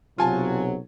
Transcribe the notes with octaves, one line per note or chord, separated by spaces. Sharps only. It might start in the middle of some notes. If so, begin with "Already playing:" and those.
B1 C3 F#3 F4 G#5 A5